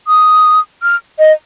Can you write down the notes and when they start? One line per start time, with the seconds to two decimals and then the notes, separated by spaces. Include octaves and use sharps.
0.07 D#6
0.83 F6
1.19 D#5